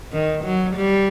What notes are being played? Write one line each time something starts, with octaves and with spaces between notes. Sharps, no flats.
D#3
F#3
G3